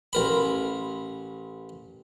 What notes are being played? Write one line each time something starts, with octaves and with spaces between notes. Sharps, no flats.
A1 A#4 B5